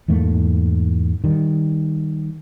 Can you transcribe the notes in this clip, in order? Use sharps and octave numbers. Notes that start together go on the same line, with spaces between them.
E2 G#2 A3 A#3
D#3 G3